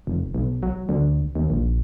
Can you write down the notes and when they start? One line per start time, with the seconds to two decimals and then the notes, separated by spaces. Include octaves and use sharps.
0.07 F1
0.35 B1
0.63 F#3
0.89 D2
1.35 D#2
1.50 A#1